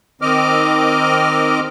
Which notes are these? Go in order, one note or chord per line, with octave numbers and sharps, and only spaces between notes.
D#3 C4 D#5 D6 F6